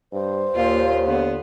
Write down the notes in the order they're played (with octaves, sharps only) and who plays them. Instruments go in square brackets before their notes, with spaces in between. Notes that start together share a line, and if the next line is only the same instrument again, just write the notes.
[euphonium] G2 [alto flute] C5
[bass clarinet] D#2 [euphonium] A#2 [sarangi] F4
[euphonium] D3 [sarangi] B3